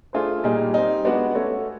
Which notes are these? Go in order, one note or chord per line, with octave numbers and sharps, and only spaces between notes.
A3 D4 F4 G#4 C5
A#2 G3 A#3 D#4 G#4
G3 C4 D#4
G#3 B3 D4 F#4 B4
A3 C#4 F#4 A4 C#5